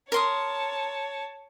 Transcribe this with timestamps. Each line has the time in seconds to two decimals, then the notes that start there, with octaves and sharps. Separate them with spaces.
0.12 A#4 C#5 A5 C6 D#6